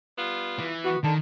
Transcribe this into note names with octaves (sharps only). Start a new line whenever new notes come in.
G3 B3 F4
E3
B3 F#4
D3 D#3 A5